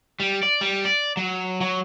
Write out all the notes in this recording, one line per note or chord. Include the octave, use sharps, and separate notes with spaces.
G3
D5
G3
D5
F#3
F#3